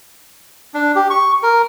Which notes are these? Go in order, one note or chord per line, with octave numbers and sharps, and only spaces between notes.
D4
G4
C#6
A#4